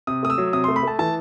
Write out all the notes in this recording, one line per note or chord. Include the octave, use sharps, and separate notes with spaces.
C3 D#6
A3 D#6
E6
F#3
C3 D#6
A3 C6
B5
A3 A5
E3 A5